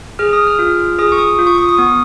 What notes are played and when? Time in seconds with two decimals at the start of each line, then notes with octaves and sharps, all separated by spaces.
0.19 G#4 F6
0.33 D#6
0.47 F6
0.59 F4
0.99 G#4 D#6
1.12 C#6
1.18 D#6
1.39 F4
1.47 C#6
1.58 D#6
1.69 D#6
1.78 B3 C#6